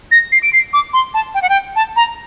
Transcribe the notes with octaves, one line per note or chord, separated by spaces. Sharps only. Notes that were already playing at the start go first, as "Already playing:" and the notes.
A#6
C7
D7
C7
D6
C6
A5
G5
F#5
G5
A5
A#5